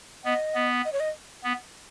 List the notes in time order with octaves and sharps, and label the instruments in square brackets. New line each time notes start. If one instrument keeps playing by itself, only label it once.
[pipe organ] B3 [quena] D#5
[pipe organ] B3
[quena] D#5
C#5
D#5
[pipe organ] B3